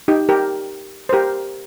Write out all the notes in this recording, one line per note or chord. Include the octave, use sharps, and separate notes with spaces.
D#4 G4
G4 A#4
C5
G4 A#4